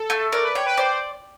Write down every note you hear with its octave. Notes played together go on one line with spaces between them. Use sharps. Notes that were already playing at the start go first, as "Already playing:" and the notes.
Already playing: A4
A3
A#4 D5
B4
C#5 G5
B4
C5 D5